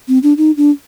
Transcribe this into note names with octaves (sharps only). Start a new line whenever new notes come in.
C4
D4
D#4
D4